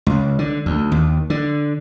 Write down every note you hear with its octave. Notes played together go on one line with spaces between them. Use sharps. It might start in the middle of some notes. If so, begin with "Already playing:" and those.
C#2
D3
D2
D#2
D3